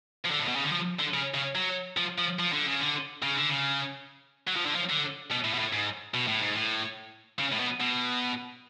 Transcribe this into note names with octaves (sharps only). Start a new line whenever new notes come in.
F3
D3
A2
B2
C#3
D3
F3
D3
C#3
C#3
F#3
F3
F3
F3
D3
C#3
D3
C#3
D3
C#3
F#3
F3
D3
F3
D3
B2
A2
B2
A2
G#2
B2
A2
G#2
A2
C#3
A2
B2
B2